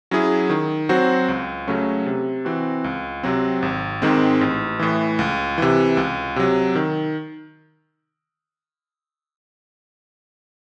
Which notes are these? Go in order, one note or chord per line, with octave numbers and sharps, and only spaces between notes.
F#3 C#4 E4 G#4
D#3
F#3 C4 F#4 C5
C#2
C#3 F#3 A3 C#4
C3
E3 C4 F#4
C#2
C3 F#3 C4
G#1
G#2 D#3 G#3 C4
A1
A2 E3
C#2
C3 E3
C#2
C3 F#3
D#3